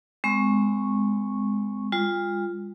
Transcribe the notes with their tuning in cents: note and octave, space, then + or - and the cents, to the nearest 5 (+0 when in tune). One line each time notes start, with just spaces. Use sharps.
G#3 -5 C4 -35 C#6 -10
G3 +45 F4 +0